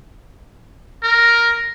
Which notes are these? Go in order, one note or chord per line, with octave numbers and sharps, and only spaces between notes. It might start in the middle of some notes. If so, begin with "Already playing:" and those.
A#4